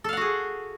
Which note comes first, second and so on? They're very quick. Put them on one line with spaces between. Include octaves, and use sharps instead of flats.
A4 F5 F#5 F#4 G#4